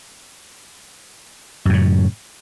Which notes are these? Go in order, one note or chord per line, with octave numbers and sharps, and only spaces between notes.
F#2 A2 C#3